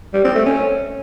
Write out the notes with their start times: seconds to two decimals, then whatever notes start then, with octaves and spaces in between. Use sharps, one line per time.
0.14 G3
0.24 C4
0.35 A3
0.46 C#4